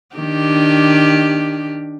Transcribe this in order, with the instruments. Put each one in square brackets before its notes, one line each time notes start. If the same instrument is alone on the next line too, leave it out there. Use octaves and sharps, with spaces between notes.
[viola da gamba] D#3 D4 G4